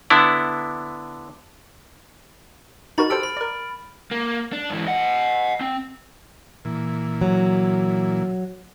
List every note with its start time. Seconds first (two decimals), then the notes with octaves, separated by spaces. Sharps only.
0.10 D3 B3 D4 E4
2.98 D#4 F#4 A#4 B5 A6
3.10 G4 A4 C5 F6 D7
3.23 B5
3.37 A#4 D5
4.11 A#3
4.53 D4
4.70 G#2 E3
4.86 D#5 F#5
5.61 C4
6.65 A#2 E3
7.21 F#3